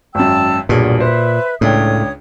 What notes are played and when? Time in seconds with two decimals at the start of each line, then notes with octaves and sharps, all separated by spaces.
0.15 G#1 F#2 G5 A5 E6
0.69 B1 E2 G2 A#2 G#4
1.00 B4 C5 E5
1.61 C#2 A2 D4 C#5 G5 D#6